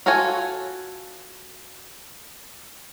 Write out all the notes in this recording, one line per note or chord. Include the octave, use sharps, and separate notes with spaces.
F4 F#4 A4 C#5 G#5